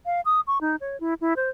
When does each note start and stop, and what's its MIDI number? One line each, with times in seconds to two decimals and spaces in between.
0.06 0.21 77
0.25 0.41 87
0.47 0.58 85
0.61 0.76 63
0.81 0.99 73
1.00 1.14 64
1.21 1.34 64
1.36 1.50 72